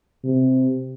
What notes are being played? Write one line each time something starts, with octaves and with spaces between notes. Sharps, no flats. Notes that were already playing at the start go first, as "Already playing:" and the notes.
C3